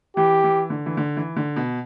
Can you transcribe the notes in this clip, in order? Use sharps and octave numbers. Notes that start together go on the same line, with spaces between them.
E3 G4
E3
D3
E3
D3
E3
D3
B2